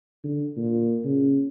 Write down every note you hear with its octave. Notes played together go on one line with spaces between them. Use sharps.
D3
A#2
C#3